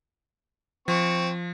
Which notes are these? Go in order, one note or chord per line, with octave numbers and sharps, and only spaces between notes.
F3 C4 C#6